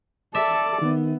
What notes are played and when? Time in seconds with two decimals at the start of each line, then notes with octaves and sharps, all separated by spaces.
0.35 A4 D5 E5
0.81 D#3 B3